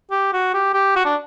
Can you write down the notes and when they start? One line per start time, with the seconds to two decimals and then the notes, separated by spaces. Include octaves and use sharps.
0.11 G4
0.33 F#4
0.54 G4
0.74 G4
0.96 F#4
1.05 D4